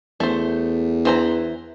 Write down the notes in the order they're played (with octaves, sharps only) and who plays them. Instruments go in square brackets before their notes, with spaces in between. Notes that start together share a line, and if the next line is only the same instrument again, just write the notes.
[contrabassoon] E2 [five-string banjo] A3 C5
[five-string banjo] E3 C5 A#5